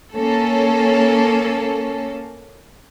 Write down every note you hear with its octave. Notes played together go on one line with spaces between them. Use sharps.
A#3 C#4 A4